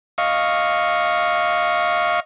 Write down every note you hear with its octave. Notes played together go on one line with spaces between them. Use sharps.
D#5 F5 C#6